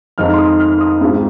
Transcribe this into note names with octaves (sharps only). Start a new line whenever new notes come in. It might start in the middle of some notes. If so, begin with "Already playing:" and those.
F2 D#3 G#3 D#4 F6
C6
D#6
F6
D#6
G#2 G#3 C4 F4